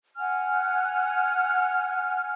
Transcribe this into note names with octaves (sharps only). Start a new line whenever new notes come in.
F#5 G#5 F6